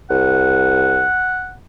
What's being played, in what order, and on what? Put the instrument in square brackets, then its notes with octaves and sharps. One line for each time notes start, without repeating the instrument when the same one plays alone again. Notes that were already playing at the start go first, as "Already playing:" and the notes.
[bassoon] C2 [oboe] F#5